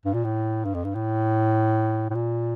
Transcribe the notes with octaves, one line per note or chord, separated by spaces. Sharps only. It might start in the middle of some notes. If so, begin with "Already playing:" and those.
G2
A#2
A2
G2
F2
G2
A2
A2
A#2